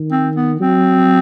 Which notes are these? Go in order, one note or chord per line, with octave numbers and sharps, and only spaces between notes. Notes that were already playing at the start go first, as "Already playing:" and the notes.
Already playing: D#3
C4
B3
F#3 C4